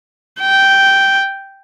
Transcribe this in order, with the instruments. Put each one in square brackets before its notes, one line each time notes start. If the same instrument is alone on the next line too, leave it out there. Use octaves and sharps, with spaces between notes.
[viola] G5